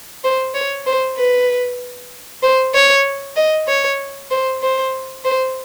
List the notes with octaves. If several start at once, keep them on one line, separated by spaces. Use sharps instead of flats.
C5
C#5
C5
B4
C5
C#5
D#5
C#5
C5
C5
C5